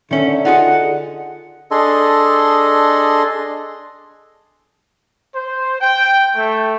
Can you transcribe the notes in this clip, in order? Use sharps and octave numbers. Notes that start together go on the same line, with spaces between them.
D3 D#3 C#4 E5
D#4 F4 F#4 G#4 D#5 F#5
D4 G#4 A4 D#5 C6
C5
G5
A3